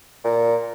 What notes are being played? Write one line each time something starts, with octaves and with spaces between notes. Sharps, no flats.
A#2